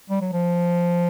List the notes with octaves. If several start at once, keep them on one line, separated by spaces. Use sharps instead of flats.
G3
F#3
F3